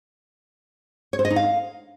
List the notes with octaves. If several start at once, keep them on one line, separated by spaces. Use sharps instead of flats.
C#5
C5
D#5
D#4
F5